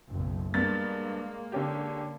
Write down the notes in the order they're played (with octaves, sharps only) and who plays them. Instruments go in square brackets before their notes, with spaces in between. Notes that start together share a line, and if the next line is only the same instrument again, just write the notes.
[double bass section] F#1 B1
[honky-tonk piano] G2 B3 A6 [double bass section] G#3 A#3
[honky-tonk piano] D3 C#4 G4